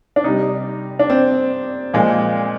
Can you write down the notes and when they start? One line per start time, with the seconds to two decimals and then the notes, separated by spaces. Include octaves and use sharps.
0.16 D4
0.24 C3 G3 D#4
0.99 D4
1.10 C4
1.93 A#2 F3 G#3